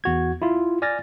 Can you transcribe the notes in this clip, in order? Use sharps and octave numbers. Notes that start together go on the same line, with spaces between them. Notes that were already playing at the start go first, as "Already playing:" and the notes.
E2 F#4 G#6
E4 F4
D5 G#5 F6 A6 A#6